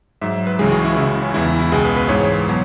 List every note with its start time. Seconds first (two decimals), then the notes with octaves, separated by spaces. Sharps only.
0.21 G#2 F#3 E5
0.47 B4
0.59 C#2 C#3 E3 G#3 G#4
0.72 F#4
0.85 E4
0.97 C#2 C#3 E3 E4
1.22 C#4
1.34 E2 E3 G#3 E4
1.47 E4
1.59 E4
1.72 C#2 B2 G#3 G#4
1.84 B4
1.96 B4
2.09 G#2 E3 G#3 C#5
2.48 B2 F#3